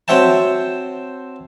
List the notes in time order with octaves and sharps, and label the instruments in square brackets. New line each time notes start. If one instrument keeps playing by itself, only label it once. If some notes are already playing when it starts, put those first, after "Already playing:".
[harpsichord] C4 F#4 C#5 E5 G5 A5